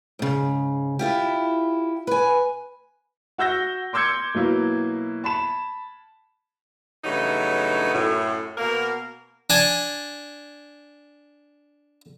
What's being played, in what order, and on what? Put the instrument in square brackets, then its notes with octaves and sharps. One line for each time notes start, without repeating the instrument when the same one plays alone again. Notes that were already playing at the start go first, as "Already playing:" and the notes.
[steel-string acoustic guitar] G#2 C#3
E4 F4 G4
B4 G#5
[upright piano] F#4 E6 G6 A#6
C6 D6 E6 G6 G#6 C#7
B2 F#3 A#3 E4
A5 B5 E7
[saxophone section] G2 C#3 E3 F#3 A3 D#4
F#2 A2
B2 A#3 A#4
[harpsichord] D4 G#5